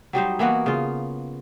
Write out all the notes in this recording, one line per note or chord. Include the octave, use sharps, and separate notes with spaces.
F#3 G3 D#4 C5
E3 A#3 B3 F#4
C#3 F4